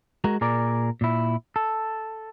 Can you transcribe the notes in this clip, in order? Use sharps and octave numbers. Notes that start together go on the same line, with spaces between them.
G#3 F#4 A#4
A#2 G#4 A#4 D5
A#2 E4
A4